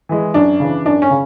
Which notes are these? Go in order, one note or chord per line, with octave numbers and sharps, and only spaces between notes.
E3 G#3
F#2 D4
C#3 E3
F#2 D4
C#4
C#3